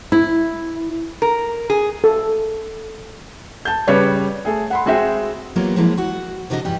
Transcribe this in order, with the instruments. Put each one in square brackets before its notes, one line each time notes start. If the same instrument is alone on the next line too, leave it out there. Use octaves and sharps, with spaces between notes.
[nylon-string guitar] E4
[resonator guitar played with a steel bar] A#4
G#4
[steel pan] A4
[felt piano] A5 G6
C#3 G3 B4 C#5 D6
A3 G#4
F#5 B5 C6
G#3 C4 F#4 G#4 E5 G5
[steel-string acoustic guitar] F#3 G3 A#3 B3 F4 A#4
F3 F#3 G#3 A#3 E4
F#4 F#5
C3 D4 D#4 F#4 C5 D#5
G2 E3 G3 G4